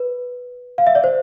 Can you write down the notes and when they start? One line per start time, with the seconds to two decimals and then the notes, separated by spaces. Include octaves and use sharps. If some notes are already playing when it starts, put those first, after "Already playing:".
Already playing: B4
0.78 F5
0.87 E5
0.95 D5
1.04 C5